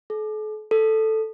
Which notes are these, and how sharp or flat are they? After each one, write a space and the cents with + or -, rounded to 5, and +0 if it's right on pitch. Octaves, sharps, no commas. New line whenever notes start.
A4 -45
A4 +0